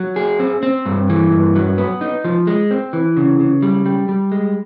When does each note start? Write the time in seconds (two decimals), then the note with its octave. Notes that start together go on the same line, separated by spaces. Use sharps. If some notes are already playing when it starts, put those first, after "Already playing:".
Already playing: F#3
0.16 G#4
0.40 C4
0.63 C4
0.86 G2
1.10 E3
1.31 G2
1.56 F#3
1.78 B3
2.01 D#4
2.25 F3
2.47 G#3
2.71 C4
2.93 E3
3.17 C#3
3.40 C#3
3.62 G3
3.86 G3
4.09 G3
4.32 G#3